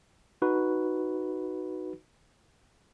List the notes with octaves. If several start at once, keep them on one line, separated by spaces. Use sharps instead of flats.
D#4 F#4 B4